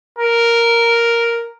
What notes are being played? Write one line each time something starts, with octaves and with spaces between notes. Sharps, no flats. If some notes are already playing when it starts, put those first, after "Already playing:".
A#4